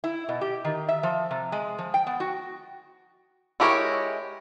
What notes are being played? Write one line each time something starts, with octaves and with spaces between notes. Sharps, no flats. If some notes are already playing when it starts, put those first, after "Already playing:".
E4
B2
G4
D#3
E5
F3
C3
G#3
F3
G5
B3
F#4
G#3 E4 G4 A#4 C#5